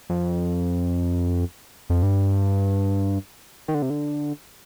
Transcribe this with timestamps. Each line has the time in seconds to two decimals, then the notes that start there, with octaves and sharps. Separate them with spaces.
0.09 F2
1.90 F2
2.03 G2
3.68 D#3
3.75 D3
3.82 C3
3.90 D3